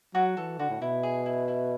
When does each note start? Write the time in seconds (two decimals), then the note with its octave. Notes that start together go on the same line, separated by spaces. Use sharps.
0.14 F#3 F#4
0.37 E3 A4
0.59 D3 F#4
0.70 A2
0.81 B2 E4
1.03 G#4
1.26 E4
1.48 E4